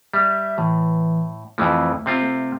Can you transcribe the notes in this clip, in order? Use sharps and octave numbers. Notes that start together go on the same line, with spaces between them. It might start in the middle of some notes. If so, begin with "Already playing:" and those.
G3 E5
A2 E3
F2 E3 F3 A3
C3 C4 F4
A3